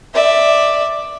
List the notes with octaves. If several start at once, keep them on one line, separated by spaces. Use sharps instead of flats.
D5 E5